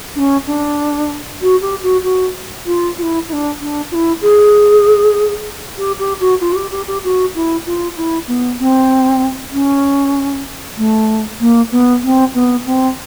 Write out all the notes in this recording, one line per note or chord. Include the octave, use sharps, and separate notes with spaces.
D4
C#4
D4
F#4
G4
F#4
F#4
F4
F4
E4
E4
D4
D4
F4
E4
G#4
G4
G4
F#4
F4
F#4
G4
G4
G4
F#4
E4
F4
E4
B3
C4
C#4
A3
A#3
B3
C4
B3
C4